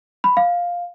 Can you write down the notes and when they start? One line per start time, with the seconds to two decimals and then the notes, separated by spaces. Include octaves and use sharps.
0.24 B5
0.37 F5